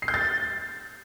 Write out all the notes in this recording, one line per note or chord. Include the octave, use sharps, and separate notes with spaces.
C7
G6
A6